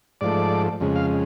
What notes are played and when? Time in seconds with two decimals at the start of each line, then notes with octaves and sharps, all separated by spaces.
0.21 G#2 F3 A3 D5
0.80 F2 C#3 G#3
0.96 F5